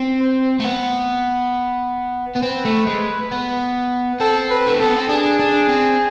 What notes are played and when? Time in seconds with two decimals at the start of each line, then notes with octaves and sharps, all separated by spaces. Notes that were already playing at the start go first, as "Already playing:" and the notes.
Already playing: C4
0.20 C5
0.60 A3
0.64 B3
2.35 B3
2.42 C4 B4
2.65 A3
2.87 G#3
3.31 B3
4.20 C4 A4
4.50 B4
4.67 A3
4.79 B3 A4
4.96 C4
5.09 D4 G#4
5.39 D4
5.69 C4